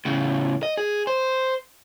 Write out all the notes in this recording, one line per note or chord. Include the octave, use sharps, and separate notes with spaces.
A2 C#3
D#5
G#4
C5